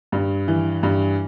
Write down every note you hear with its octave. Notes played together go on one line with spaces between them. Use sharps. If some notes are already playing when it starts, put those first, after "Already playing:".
G2
E3
G2